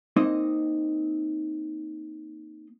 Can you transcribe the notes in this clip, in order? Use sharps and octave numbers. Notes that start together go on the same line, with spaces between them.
A#3 C4 D#4 D#5